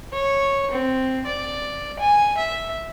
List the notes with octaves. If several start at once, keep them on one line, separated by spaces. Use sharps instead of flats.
C#5
C4
D5
G#5
E5